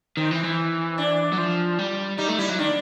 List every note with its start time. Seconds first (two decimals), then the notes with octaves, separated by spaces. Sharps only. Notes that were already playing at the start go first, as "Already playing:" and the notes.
0.17 D#3 C4
0.31 E3
0.44 E3
0.98 D4
1.33 F#3
1.38 F3
1.79 G3
2.18 G3 D#4
2.28 A3
2.39 G3 E4
2.49 F#3
2.59 D#3 D4